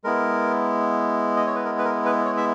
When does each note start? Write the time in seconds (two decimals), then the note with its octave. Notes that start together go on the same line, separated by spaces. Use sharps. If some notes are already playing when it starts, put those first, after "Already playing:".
0.04 G#3 B3 E4 A#4
1.37 D#5
1.46 C#5
1.55 B4
1.65 A#4
1.79 B4
1.85 A#4
2.05 B4
2.25 C#5
2.37 E5